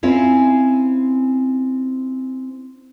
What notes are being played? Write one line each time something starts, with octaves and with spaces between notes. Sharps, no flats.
C4 C#4 E4 F4